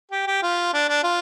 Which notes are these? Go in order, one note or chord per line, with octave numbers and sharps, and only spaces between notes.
G4
G4
F4
D4
D4
F4